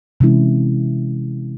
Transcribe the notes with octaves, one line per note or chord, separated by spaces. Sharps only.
C3 E3 G#3 C#4 E4